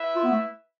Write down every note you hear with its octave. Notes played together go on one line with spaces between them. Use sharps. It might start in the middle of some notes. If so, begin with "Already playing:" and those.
Already playing: E4 B4 E5
F4
B3
A3